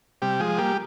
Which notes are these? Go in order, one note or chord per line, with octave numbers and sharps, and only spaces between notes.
C3 G3 G4
F3 G#3 G#4
G3 A#3 G4